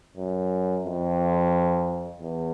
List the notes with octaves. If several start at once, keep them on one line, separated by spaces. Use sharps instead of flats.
F#2
F2
E2